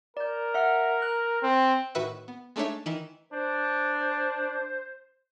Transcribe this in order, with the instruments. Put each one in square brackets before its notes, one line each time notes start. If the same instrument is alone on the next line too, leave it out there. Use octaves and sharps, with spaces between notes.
[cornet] A#4 [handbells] D5 G6
[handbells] E5 F#5 F6
F#6
[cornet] C4
[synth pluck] A2 D#3 F#4 B4 E5 F#5
B3
G#3 A3 D4 D#4 C#5 E5
D#3 E3 D#4 E4
[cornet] D4 [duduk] C5